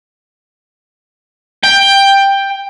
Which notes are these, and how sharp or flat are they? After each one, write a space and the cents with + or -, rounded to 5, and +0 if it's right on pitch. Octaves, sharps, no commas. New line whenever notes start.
G5 +10